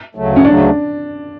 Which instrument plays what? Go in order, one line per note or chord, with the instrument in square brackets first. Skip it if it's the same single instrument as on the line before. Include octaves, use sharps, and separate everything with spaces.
[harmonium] D2 C#3 F#3 A3
[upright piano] C#4
[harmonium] D2 C#3 F#3 A3 [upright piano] D4